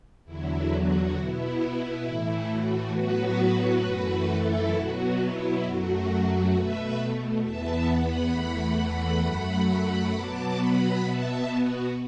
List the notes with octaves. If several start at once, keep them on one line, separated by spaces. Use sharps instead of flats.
E2 D3 F#3 E4
F#4
B2 B3 E4
A2 E3 A3
F#4
A2 F#3 B3 F#4 B4
F#2 E3 A3
E4 A4
B2 F#3 B3 F#4
E4
F#2 F#3 A3 F#4
B2 B4 E5
A3
E2 E3 B3 E5 A5
F#5 B5
E2 E3 A3
F#5 B5
F#2 F#3 A3
B2 F#3 B3 A5 D6
F#5 B5
B2 B3 E5 A5
F#4